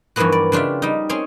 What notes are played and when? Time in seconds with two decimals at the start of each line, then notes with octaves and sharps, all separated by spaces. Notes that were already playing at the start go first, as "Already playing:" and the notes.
0.16 G2 E3 F3 A#3 B3 F#4
0.32 D5
0.52 C#3 D4 F4 G4 E5
0.82 G3 D#4
1.09 C4 C#4 G#4 C#5